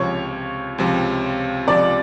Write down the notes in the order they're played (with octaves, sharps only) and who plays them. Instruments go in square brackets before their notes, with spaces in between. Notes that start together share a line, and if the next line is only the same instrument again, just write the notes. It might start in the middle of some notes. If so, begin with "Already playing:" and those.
Already playing: [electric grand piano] C#2 C3 F3 [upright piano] C#5
[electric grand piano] C#2 C3 F3
[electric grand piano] C#2 C3 F3 [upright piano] D5